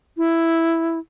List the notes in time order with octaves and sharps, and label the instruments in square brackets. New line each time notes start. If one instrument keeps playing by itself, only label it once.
[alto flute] E4